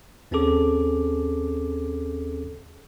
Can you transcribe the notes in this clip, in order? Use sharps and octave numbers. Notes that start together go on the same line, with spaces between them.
D#2 C4 C#4 G#4 A4 D6